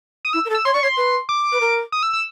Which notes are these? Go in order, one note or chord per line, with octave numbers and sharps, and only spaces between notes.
D#6
E4 E6
A#4
A4
E6
C#5 C6
D5 C#6
C#5 C6
B4
D6
B4
A#4
D#6
E6
E6